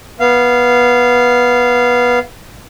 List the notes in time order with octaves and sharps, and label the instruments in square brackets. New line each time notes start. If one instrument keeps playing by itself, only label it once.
[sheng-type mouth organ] B3 F5